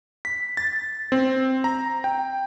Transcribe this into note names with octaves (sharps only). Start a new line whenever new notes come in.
B6
A6
C4
A#5
G5